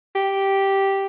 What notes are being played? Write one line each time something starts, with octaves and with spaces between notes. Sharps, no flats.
G4